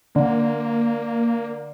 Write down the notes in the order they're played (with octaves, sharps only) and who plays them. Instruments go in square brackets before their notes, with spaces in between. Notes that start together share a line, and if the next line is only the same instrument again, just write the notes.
[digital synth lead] D3 [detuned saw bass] A#3